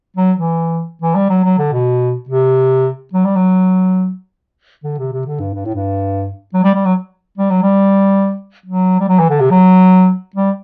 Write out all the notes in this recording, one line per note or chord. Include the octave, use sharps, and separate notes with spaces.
F#3
E3
E3
G3
F#3
F#3
D3
B2
C3
F#3
G3
F#3
D3
C3
C3
D3
G2
G2
A2
G2
F#3
G3
G3
F#3
G3
F#3
G3
F#3
G3
F#3
E3
D3
C3
F#3
G3